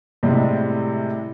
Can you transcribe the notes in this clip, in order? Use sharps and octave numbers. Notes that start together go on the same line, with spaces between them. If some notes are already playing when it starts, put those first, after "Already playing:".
A2 C3 G3 G#3